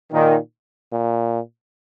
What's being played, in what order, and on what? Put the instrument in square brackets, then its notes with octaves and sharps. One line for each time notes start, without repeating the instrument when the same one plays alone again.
[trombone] A#2 [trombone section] D#3
[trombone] A#2